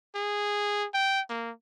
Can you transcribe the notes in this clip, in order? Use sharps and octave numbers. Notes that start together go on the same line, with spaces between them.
G#4
G5
A#3